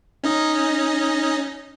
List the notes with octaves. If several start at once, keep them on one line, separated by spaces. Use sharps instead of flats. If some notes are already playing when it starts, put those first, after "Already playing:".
C#4 D#4 D#5